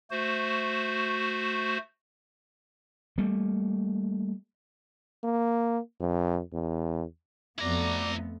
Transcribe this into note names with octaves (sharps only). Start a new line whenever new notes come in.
A3 F#4 C5
G3 A3 A#3
A#3
F2
E2
F2 A3 B3 E4 F#4 D5 A#5 D6